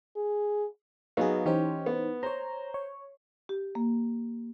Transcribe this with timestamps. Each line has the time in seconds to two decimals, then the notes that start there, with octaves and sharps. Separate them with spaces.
0.16 G#4
1.17 F#3 B3 D#4 G#4 F5
1.46 E3 C#4 D#4 G4 C5
1.86 B3
2.23 C5 C#5 A#5
2.74 C#5
3.49 G4
3.75 A#3